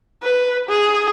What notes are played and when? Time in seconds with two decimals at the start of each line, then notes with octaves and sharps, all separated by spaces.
0.23 B4
0.69 G#4